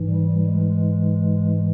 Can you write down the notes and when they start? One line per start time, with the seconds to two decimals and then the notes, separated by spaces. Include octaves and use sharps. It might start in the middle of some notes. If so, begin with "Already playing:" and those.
Already playing: G#2 E3
0.10 G3
0.46 G#3